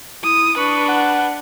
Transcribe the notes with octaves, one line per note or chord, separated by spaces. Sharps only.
E4 D#6
D4 B4 C#6
F#5